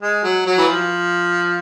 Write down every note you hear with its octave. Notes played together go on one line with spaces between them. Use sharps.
G#3
F#3
F#3
E3
F3